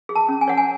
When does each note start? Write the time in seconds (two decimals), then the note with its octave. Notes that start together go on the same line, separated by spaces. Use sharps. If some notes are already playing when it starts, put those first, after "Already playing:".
0.09 G#4
0.16 A5
0.29 C#4
0.41 G#5
0.48 C#5 F#5
0.58 G#5